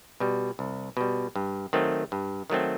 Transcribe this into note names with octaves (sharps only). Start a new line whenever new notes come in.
B2 G3
C2
B2 G3
G2
D#3 F#3 A3 C4
G2
D#3 F#3 A3 C4